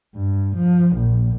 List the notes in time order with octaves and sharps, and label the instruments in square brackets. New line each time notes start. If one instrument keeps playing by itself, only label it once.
[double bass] G2
F3
A#1